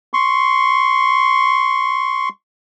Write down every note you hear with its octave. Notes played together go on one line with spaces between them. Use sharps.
C6 C#6